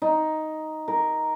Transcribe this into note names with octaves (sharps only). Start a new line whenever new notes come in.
D#4
A#4